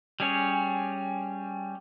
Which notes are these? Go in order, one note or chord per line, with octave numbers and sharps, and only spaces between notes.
G3 C#4 G#4 C#5